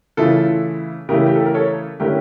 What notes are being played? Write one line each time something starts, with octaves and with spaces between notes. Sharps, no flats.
C#3 E3 A3 E4 F4 A4
C#3 E3 A3 E4 G4 A#4
G4
A4
A#4
A4 C#5
D3 A3 C#4 E4 G4 A#4